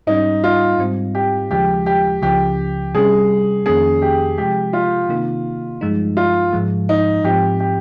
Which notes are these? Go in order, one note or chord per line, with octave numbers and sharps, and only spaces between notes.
G#2 G3 C#4 D#4
F4
G#2 G3 C4
G4
D#2 C#3 F3 G#3 G4
G4
C#2 C#3 F3 G4
C3 G3 C#4 G#4
F2 D#3 A#3 C#4 G#4
G4
C3 F3 G#3 G4
F4
C3 D#3 A#3 D#4
G2 F3 G#3 D#4
F4
G#2 F3 G#3
D#4
G#2 F3 C4 G4
G4